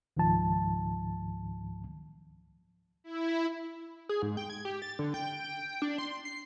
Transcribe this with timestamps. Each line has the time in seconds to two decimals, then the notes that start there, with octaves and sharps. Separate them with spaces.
0.17 C#2 G#2 D#3 F3 A5
3.04 E4
4.09 G#4
4.22 G#2
4.37 G5
4.50 G#6
4.65 G4
4.82 A6
4.99 D3
5.14 G5
5.82 D4
5.98 C6
6.25 C7